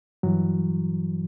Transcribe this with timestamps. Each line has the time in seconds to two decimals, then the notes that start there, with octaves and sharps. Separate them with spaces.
0.23 G2 E3 F#3